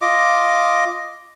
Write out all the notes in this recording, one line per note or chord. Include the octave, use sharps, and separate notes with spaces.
F4 D#5 D6